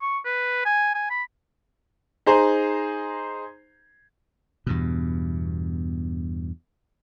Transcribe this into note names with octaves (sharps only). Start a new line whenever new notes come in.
C#6
B4
G#5
G#5
B5
D#4 G#4 C5 A#5
E2 G2 B2